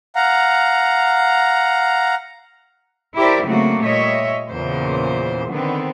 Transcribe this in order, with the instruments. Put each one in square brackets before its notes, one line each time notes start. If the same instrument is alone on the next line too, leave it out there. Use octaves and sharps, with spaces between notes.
[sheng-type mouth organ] F5 F#5 A#5
[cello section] E4 G4 A#4 C5 D5 E5
C#3 F#3 A3 A#3 C4 F#4
A#2 G3 C#5 D#5 E5
E2 A#2 C#3 C5
D3 D#3 B3 C4